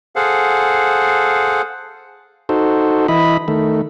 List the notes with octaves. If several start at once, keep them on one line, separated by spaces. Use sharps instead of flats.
G#4 A4 C5 F5 F#5
D#4 F#4 A4 C5
E3 E4 D#5 B5
D#3 A3